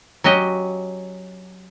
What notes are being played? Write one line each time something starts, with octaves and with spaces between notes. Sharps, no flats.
F#3 C#4 F#4 G4 D#5